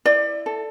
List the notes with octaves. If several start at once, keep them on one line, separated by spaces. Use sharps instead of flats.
E4 D5
A4